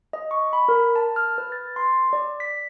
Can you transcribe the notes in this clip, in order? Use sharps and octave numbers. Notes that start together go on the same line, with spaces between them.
D#5
C#6
B5
A#4
A5
F6
B4
A6
C6
D5
B6